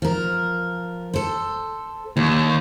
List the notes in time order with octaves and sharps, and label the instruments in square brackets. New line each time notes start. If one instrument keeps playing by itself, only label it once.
[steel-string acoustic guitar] F3 A#4
A4 C5
[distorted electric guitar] D#2 [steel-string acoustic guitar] D3